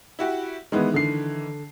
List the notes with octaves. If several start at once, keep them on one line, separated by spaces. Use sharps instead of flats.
E4 F#4 G4
D#3 E3 G#3 B3
D3 C7